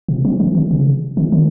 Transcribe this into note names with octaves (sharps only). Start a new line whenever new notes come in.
C3
F#3
E3
D#3
C#3
D#3
D#3